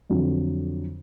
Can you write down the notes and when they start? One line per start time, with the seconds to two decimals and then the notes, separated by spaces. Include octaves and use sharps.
0.10 F2 D3 F#3